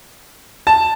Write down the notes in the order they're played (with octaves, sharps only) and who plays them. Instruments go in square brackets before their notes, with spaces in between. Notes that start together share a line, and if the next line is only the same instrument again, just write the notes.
[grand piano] A5